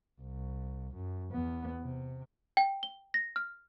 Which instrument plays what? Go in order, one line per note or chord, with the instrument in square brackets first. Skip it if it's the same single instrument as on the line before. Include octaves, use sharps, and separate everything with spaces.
[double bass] C2
F#2
E2 B3
C3
[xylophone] G5
G7
A#6
F6